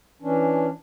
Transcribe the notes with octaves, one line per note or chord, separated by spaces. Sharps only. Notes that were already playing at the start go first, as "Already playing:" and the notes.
E3 C#4 D4